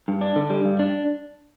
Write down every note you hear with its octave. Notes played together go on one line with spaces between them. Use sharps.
G2
D4
D3
G3
G2
D4